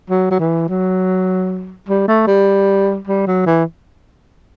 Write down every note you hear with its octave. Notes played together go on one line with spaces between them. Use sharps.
F#3
F#3
E3
F#3
G3
A3
G3
G3
F#3
E3